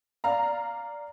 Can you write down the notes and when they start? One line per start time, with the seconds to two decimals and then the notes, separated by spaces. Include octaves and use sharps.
0.24 D5 F5 A#5